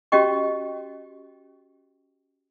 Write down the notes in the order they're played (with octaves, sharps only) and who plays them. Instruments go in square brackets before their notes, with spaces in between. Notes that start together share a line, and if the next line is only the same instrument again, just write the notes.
[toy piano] C#4 F#4 G4 D#5 G5 C#6